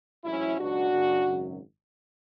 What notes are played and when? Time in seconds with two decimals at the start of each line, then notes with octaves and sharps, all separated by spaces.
0.24 A1 G#2 F#3 C#4 E4
0.58 C#2 B2 F#3 D4 F#4
0.91 F#1 F#2 C#3
1.25 G#1 F#2 C#3 F#3